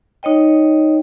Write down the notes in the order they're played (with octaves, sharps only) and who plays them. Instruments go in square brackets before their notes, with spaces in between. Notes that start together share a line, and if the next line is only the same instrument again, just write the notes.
[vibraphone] D#4 C#5 D#5 G5